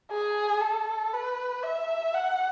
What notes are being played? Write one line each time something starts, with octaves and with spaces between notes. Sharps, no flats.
G#4
A4
B4
E5
F#5